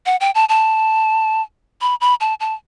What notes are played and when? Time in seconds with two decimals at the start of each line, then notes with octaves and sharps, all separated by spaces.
0.06 F#5
0.21 G5
0.35 A5
0.49 A5
1.81 B5
2.01 B5
2.21 A5
2.40 A5